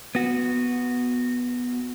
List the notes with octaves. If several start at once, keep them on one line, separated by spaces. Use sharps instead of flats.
B3 F#4